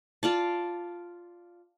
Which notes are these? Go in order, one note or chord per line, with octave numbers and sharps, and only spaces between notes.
F4 D5 A5